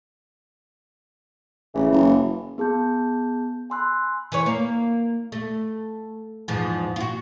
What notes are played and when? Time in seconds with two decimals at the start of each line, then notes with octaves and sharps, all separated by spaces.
1.74 A1 C#3 E3
1.92 F#1
2.58 B3 G#4 A5 G6
3.70 G#5 B5 C6 E6 F#6
4.32 E3 B4 C#5
4.46 A#3
5.32 A3
6.48 E2 G#2 F3
6.96 F4 F#4